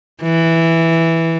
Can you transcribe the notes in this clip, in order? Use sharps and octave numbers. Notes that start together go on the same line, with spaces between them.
E3